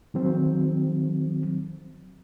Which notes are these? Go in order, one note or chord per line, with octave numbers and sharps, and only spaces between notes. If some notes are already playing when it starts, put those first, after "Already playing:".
D#3 F#3 C4